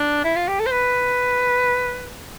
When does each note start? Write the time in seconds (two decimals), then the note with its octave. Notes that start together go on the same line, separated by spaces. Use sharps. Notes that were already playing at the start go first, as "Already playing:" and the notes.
Already playing: D4
0.24 E4
0.36 F4
0.48 G4
0.60 A4
0.66 C5
0.72 B4